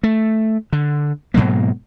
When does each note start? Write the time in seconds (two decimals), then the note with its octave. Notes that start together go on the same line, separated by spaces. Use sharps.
0.03 A3
0.73 D3
1.34 G#2 B2 F#3 A#3